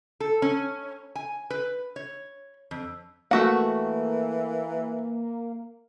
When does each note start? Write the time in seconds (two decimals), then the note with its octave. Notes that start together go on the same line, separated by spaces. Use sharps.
0.20 A4
0.42 C#4
1.15 G#5
1.50 B4
1.96 C#5
2.71 F2
3.31 E3 A3 A#3 F#4 F#5